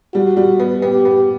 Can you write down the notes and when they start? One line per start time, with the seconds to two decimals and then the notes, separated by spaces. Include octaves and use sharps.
0.14 G3 F#4
0.37 G3
0.59 B3
0.82 B3 G4
1.05 B3